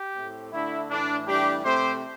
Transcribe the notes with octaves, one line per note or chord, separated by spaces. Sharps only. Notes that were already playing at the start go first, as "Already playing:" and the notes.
Already playing: G4
A2 A3 C4
D3 A3 D4 E4
A2 E3 A3 D4
A2 E3 G3 D4 G4
C3 A3 C4 G4 C5